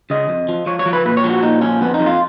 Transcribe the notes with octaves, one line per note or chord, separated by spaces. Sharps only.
C#3 D#5
F2
F3
F3 C#5
C#5
F3
B4
A#2 B4
C#5
F3
F#4
A#2 D#4
F3 C#4
F2 B3
D#4
F2
F4